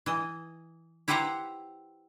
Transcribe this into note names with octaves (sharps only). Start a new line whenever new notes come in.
E3 D#5
E4 G4 B4 C5 F#5 A#5